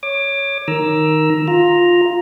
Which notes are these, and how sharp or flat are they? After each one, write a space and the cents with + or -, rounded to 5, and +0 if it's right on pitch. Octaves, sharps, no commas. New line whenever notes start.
C#5 +0 D6 +25
D#3 +0 A#5 +10 E6 +0
F4 +10 A#5 +0